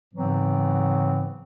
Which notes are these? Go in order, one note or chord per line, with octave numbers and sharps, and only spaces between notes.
G#2 C#3 E3 F#3 B3 C4